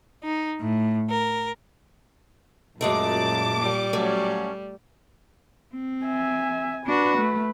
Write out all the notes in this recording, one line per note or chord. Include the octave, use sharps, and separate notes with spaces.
D#4
A2
A#4
F#2 A#2 F#3 G#3 A3 A5 D6
G3
F#3 A3 C#4
C4
E5 G#5
D4 F#4 B4
A3